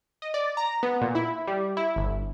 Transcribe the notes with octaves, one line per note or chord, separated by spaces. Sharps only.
D#5
D5
A#5
B3
A#2
E4
G3
E4
G1